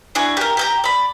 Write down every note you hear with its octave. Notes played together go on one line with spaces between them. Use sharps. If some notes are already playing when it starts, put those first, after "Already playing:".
D4 E4 F#4 G#4
G4 A#4
G4 G5 A#5
D5 B5